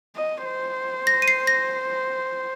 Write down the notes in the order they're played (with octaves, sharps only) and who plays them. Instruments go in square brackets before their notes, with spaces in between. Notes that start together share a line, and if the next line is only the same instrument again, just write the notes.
[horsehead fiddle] D#5
C5
[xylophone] A#6
D#7
C7
A#6